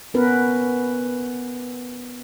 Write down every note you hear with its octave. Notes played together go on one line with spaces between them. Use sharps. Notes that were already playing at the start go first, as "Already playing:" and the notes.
B3 C#4 A#4 B4